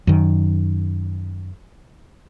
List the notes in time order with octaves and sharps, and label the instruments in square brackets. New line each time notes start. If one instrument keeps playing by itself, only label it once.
[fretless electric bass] F#2 D#3